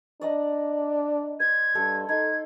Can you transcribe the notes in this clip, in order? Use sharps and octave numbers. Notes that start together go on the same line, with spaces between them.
D4 D5 D#5 A#5
C5 G#6
G2 A4
D#4 A4 C6 G#6